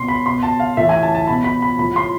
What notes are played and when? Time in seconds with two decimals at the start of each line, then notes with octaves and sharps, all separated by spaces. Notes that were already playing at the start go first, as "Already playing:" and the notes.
Already playing: B2 C6
0.08 B5
0.26 B2 C6
0.43 A5
0.60 F5
0.77 A2 E3 E5
0.89 G#5
1.03 A5
1.15 A5
1.27 B2 B5
1.44 B5
1.62 B5
1.78 A2 F3 B5
1.96 C6